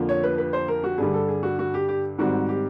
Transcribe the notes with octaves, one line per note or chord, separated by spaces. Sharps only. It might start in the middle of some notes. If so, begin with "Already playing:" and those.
Already playing: F2 D3 F3 A#3
C#5
B4
B4
C5
A#4
F#4
G2 D3 G3 G#4
A4
G#4
F#4
F#4
G4
G4
G#2 D#3 G3 C4 F#4
G4